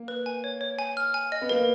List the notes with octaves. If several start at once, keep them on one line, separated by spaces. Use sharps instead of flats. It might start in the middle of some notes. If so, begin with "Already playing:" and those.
Already playing: A#3
B4
G#5
C#5
C#5
G#5
F6
G#5
D#5
B3
A#3 A#4